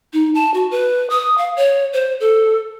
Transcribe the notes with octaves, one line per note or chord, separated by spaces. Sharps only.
D#4
A5
F#4
B4
D#6
F5
C#5
C5
A4